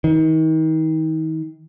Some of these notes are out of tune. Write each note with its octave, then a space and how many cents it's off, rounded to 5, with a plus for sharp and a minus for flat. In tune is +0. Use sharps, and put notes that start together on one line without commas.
D#3 +35